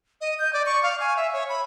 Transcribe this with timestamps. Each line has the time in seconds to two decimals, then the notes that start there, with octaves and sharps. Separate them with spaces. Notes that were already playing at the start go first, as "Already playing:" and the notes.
0.21 D#5
0.39 G6
0.53 D5
0.66 C#6
0.83 F5
1.00 G#5
1.17 E5
1.33 C#5
1.49 B5